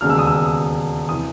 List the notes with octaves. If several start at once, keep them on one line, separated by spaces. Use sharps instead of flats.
E1 D#2 C#3 F6
E6
D#6
E6
C3 E3 D#6